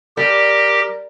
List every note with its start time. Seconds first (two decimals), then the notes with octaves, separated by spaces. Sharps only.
0.17 G3 G4 A#4